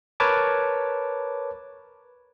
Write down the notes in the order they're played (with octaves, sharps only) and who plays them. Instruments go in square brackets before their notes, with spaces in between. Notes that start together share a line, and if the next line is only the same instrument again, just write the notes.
[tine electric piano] A#4 B4 C#5 A5 D6